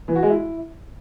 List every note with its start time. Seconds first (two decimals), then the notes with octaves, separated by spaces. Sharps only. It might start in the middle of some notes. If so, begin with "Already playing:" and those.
0.08 E3
0.15 F#4
0.23 G#3
0.30 E4